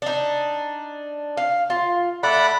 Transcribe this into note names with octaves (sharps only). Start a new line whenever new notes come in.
D4 D#4
F5
F4
A3 D5 F#5 B5